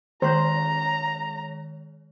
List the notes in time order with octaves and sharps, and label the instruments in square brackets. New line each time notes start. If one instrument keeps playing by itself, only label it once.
[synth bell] D#3 G#3 C#5 [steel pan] C5 [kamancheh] A#5